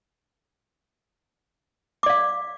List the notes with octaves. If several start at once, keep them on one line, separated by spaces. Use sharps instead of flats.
D5 F5 D6